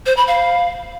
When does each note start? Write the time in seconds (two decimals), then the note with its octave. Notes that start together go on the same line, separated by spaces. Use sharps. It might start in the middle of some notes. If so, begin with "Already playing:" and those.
0.06 C5
0.17 B5
0.27 F5